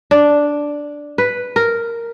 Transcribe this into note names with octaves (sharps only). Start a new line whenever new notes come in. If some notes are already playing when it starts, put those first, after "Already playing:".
D4
B4
A#4